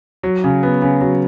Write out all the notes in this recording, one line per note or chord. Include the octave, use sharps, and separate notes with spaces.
F#3
C#3
B3
C#3
F#3